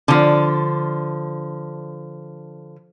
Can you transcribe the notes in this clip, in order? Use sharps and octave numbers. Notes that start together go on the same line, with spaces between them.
D3 F3